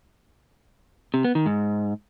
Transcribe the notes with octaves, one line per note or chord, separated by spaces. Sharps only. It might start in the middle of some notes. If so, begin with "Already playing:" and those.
C3
B3
D#3
G#2